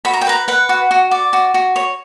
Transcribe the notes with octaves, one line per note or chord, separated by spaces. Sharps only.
F#4 B5
A#5
G5
B4 A#5
B4 F#5
F#4
F#4
D5
F#4
F#4
C#5